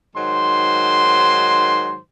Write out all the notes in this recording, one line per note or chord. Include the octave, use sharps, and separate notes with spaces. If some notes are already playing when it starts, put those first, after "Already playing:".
G#2 D#3 F#3 C5 C6